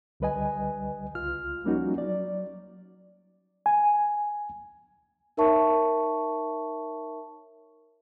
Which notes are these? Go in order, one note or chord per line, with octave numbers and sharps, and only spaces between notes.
C#2 D3 G3 B4 D#5 G#5
C#2 F4 F6
F3 G3 A#3 C#4 D#4 F#4
F#3 D5
G#5
D#4 A#4 C#5 E5 A5 C#6